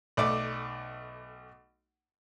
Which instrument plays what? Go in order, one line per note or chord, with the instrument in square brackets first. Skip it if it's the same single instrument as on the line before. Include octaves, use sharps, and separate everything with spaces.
[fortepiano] B1 A3 D5